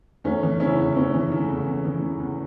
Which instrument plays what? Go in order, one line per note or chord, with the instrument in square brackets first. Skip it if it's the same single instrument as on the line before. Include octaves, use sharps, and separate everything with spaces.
[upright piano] E2 A3 C#4
E3
C#3 C#4 E4
E2
E2 C#4 E4
E3
C#3
E2
E2
E3
C#3
E2